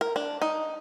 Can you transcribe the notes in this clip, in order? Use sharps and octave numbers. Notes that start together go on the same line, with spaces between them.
A#4
D4
D#4